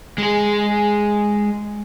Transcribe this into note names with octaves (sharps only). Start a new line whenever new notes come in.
G#3 G#4